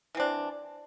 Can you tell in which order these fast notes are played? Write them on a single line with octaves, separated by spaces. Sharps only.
E3 C4 D4